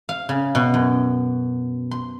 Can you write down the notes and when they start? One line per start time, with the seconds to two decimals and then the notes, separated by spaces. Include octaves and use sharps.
0.09 F5
0.29 C#3
0.55 B2
0.74 F#2
1.91 C6